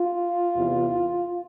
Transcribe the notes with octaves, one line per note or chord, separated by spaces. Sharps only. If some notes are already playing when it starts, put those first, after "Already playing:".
Already playing: F4
E2 C3 E3